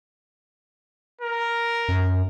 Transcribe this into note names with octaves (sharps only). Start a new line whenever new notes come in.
A#4
F#2